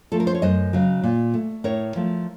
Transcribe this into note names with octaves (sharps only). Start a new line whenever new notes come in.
F3 A3 A4
A#4
C5
C#5
F#2 C5 D#5
C#3 F#3
A#2
A3
A2 A#4 C#5
F3 A3